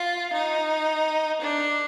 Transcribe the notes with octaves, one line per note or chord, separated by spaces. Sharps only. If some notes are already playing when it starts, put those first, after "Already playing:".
Already playing: F4
D#4
D4